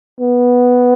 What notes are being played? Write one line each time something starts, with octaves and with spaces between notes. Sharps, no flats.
B3